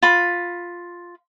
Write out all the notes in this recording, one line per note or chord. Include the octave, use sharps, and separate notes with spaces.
F4 B5